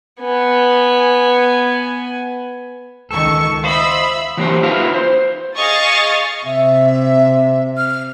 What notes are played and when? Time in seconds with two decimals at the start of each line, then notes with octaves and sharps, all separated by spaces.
0.20 B3 G#5
3.11 C#2 D#3 A4 C#6
3.64 F4 C5 D#5 E5 B5 E6
4.37 E3 F#3 A#3 G4 C5
4.63 D#4 F4 F#4 B4 E5 F5
4.94 C5
5.56 G#4 D#5 F5 C#6 D#6 A6
6.46 C3 E5
7.77 F6